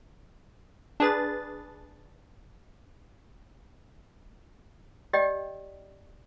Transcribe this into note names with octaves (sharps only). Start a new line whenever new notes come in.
D4 G#4 B4 A6
G4 D5 D#5 G5